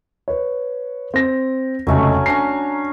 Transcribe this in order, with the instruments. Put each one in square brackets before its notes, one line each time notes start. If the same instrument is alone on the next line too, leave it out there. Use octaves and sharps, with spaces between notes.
[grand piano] B4 C#5
C4 A#6
[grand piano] F1 C#2 [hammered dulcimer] F#3 A3 C#4
[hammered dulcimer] C#4 D4 A#5 [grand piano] C7